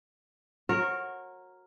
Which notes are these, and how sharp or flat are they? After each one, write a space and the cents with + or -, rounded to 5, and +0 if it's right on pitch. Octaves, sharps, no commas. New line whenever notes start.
F#4 -15 A#4 +0 C#5 -30